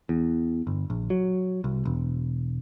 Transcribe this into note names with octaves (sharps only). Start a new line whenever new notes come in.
E2
G1
A#1
F#3
C2
E1